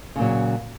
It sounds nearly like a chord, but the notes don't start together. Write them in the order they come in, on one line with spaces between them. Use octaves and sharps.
C#3 A#2 F#3